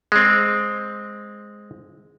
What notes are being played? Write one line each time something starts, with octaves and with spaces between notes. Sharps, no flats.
G#3 C4